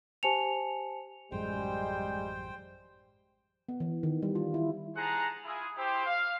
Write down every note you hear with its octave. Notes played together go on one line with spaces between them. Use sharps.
G4 C5 G#5 A5 C#7 F7
A1 F#2 G3 G#3 C5 G5
B3
E3
D#3
G3
F4
E4
G#4 C5 F#5 A5 A#5
E4 F4 G#4
E4 G4 C5
F5